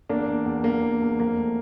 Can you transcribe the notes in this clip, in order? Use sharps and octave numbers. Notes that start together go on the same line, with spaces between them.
E2 A#3 D4
E2
E2
E2 A#3
E2
E2
F2 A#3
A3